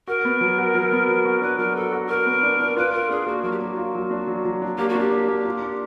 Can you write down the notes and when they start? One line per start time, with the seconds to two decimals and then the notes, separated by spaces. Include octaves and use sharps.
0.08 F#4 A#4
0.25 B3
0.41 F#3
0.58 F#4
0.75 F#3
0.92 B3
1.08 F#3
1.25 F#4
1.42 D4 B4
1.58 F#3 A#4
1.76 F#4 A4
1.93 F#4
2.09 F#4 A#4
2.26 B3
2.43 D4
2.60 D4
2.77 F4 B4
2.93 F4 A#4
3.10 D4 G#4
3.26 A#3 F#4
3.43 F#3 F#4
3.52 G4
3.59 A#3 F#4
3.77 F4
3.95 F#3
4.11 D4
4.28 F#3
4.45 F#3
4.62 D4
4.78 A#3 G4
4.89 F#4
4.95 D4 G4
5.11 D4
5.28 A#3
5.45 F4
5.62 D4